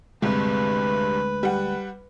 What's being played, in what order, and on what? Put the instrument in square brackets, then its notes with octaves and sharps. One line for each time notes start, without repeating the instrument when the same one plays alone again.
[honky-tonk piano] G1 G2 C3 [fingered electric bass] D2 G#3 [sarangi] B4
[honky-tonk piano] G3 F#5